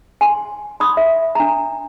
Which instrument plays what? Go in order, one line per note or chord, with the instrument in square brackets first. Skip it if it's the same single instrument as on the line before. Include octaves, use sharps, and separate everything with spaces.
[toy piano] G#5 C6
B5 C6 D#6
E5
D4 A#5